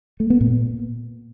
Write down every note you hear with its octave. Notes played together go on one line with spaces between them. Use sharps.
A3
B3
A#2